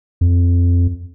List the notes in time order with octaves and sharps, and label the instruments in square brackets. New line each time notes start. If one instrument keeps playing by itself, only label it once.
[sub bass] F2